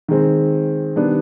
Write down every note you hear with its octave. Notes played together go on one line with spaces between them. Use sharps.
D#3 G#3 C4
D#3 G3 B3 D4